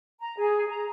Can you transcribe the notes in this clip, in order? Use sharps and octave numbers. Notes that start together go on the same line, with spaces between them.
A#5
G#4
A#5